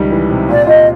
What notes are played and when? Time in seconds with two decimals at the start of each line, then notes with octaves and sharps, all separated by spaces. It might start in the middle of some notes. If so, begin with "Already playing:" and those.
Already playing: C#2 D#3 G3
0.12 E3
0.30 C3
0.48 A#2 D5
0.67 F4 D#5